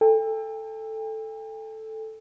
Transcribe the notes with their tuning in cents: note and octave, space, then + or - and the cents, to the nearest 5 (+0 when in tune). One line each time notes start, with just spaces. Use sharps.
A4 +0 G5 +40